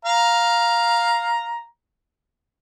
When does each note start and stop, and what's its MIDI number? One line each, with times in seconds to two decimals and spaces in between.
0.05 1.63 77
0.05 1.63 82